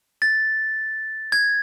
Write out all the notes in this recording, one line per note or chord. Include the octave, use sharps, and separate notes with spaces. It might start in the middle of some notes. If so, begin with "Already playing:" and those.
A6
G#6